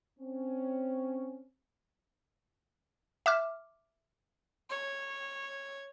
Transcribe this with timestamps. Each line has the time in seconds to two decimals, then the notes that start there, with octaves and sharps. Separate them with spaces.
0.19 C4 C#4
3.26 E5 D6 F6
4.69 C#5